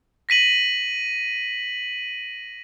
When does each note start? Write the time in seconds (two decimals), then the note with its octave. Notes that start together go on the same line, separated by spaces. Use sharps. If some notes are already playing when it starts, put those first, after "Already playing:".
0.29 A#6 B6 D#7 F#7